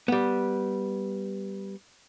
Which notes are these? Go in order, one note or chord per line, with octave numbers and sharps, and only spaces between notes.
G3 B3